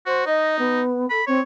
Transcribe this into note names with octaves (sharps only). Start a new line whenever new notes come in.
F#4 C5
D#4 D#5
B3
A4 B5
C4 C#5